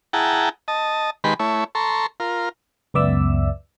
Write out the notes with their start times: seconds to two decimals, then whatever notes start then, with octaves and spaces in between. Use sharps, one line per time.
0.13 E4 G#4 F#5 G5 A5 A#5
0.68 D#5 A5
1.24 D#3 G#3 G4 B4 B5 C6
1.39 A3 E4 C#5
1.75 A4 A#5 C6 C#6
2.20 F4 A#4
2.94 C#2 F#2 B3 D5 E5 E6